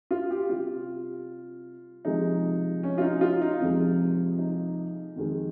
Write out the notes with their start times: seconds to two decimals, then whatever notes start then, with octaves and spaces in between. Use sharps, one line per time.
0.11 F4
0.30 G4
0.49 C3 G3 F4
2.05 C3 F3 G#3 D#4
2.83 C#4
2.98 F4
3.02 D#4
3.21 F4
3.42 D#4
3.60 F2 C3 F3 G#3 C4
4.39 D#4
5.16 F2 D#3 G#3